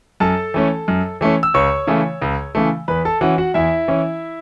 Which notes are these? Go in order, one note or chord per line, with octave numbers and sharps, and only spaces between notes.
F#2 A4 A5
E3 A3 C#4
F#2
E3 A3 C#4
E6
C#2 C#5 C#6
C#3 E3 A3
C#2
C#3 E3 A3
E2 B4 B5
A4 A5
E3 C#4 F#4 F#5
F#4 F#5
E2 E4 E5
E3 C#4